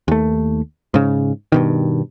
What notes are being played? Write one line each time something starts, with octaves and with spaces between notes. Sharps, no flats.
D#2 A3
G#2 C#3
G2 B2 D#3